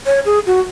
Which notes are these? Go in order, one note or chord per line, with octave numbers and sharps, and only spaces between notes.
C#5
G#4
F#4